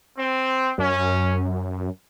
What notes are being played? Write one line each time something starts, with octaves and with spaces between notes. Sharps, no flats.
C4
F#2 C#4